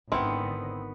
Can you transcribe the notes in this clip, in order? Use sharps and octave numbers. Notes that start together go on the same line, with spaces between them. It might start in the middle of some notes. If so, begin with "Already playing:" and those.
G#1 D3 D#3 B3 C4 E4